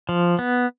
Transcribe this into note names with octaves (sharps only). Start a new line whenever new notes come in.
F3
B3